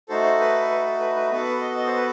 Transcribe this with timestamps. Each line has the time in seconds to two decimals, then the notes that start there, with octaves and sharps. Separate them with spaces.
0.09 A3 D#4 F#4 A4 C5
0.24 C5
0.40 B4
0.70 B4
0.86 A4
1.00 B4
1.16 B4
1.31 B3 F#4 A4 B4
1.61 D#5
1.77 D#5
1.86 C5
1.96 B4